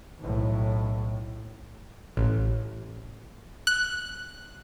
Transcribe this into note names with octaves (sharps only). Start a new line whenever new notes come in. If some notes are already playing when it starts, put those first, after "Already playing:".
B1 A2
A1
F#6